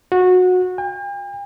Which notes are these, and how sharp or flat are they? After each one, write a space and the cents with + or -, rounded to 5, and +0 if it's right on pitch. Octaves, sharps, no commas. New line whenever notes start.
F#4 -20
G5 +45